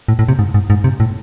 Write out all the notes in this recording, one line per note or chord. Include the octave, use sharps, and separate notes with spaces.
A2
A2
C3
G#2
G#2
G#2
C3
A2